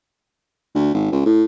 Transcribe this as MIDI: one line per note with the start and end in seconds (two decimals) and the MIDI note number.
0.75 0.91 38
0.94 1.11 32
1.12 1.22 37
1.26 1.44 45